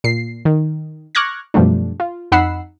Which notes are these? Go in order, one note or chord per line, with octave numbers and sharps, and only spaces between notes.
A#2 C7
D#3
C#6 D6 F6 F#6 G#6 A#6
F#2 B2 F3 G3 A3 D4
F4
F2 D#4 F#5 B5 E6 C7